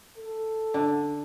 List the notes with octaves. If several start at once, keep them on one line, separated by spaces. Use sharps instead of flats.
A4
D3